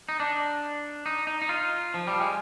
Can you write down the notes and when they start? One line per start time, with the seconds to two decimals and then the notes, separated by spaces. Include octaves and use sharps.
0.09 D#4
0.20 D4
1.06 D#4
1.27 D#4
1.42 D#4
1.49 F4
1.94 F3
2.07 G3
2.21 G#3